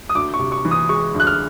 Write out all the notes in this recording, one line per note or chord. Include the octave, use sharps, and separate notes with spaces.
D#6
D2 D6
C#6
C3
C#6
E3
D#6
G#3 C#6
D2
F#6
F6